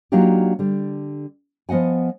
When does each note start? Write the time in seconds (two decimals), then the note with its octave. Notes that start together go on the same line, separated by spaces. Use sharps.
0.12 F#3 A#3 D4 D#4 F4 G4
0.59 D3 G3
1.69 F3 B3 D#5 F#5 G#5